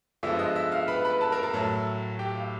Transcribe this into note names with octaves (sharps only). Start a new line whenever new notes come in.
G2 D3 F3 G#3 B3 E5 E6
D#5 D#6
E5 E6
F5 F6
B4 B5
B4 B5
A4 A5
A#4 A#5
A4 A5
A2 F#3 A3 A4 A5
G4 G5
F5